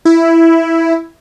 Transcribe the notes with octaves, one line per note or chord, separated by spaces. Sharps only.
E4